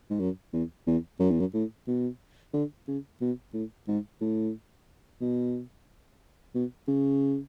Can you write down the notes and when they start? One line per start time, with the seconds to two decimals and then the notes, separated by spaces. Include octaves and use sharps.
0.10 G#2
0.19 F#2
0.53 E2
0.87 E2
1.20 F#2
1.30 E2
1.40 F#2
1.54 A2
1.87 B2
2.53 D3
2.88 C#3
3.21 B2
3.53 A2
3.88 G#2
4.21 A2
5.21 B2
6.55 B2
6.88 C#3